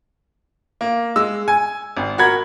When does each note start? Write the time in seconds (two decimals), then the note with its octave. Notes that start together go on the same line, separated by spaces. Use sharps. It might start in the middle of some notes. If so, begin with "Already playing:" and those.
0.81 A#3
1.16 G#3 E6
1.48 G#5
1.97 G#1
2.18 F#4 A#4 B5 G#6